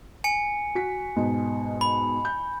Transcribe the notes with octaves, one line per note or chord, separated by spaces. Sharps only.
G#5 C#7
F#4 B6
G#2 B2
B5
G6